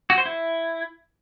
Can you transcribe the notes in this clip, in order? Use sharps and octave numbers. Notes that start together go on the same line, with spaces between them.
F#4
C5
E4